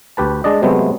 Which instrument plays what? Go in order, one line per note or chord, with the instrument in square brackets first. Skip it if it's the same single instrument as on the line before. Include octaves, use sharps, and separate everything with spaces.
[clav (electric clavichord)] D2 G4 B4 A5
G#3 D4 D5 D#5
C3 F#3 G#3 A3 B3 C4